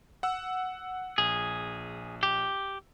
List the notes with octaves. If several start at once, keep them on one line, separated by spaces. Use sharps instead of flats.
F#5 E6
A#1 G#4
G4